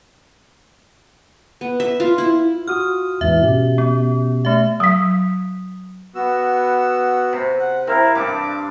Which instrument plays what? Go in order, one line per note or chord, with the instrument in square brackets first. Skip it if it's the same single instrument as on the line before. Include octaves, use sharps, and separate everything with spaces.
[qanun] B3
E5
F4
E4
[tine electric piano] F4 F#4 D#6 [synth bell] F6
[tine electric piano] E2 G#2 E3 [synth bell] E5
[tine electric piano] B2 C#4 G4
[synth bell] B3
A3 E5
[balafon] F#3 F5 [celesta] D#6 B6
[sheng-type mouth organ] B3 F#4 E6
[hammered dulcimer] C3
[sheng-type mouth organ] F#5
[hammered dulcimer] C4 F5 [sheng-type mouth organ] E4 A#4
[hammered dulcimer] G2 G3 D4 [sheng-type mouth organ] D6